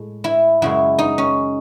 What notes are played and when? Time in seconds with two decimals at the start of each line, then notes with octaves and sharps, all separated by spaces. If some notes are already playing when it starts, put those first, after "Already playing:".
Already playing: A2 G#3
0.24 E4
0.62 F#2 C#3 G#3 E4
0.99 D#4
1.18 C#4